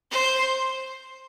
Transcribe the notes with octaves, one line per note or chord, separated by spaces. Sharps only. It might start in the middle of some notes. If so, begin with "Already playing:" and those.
C5